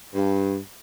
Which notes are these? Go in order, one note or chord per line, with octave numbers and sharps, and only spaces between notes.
G2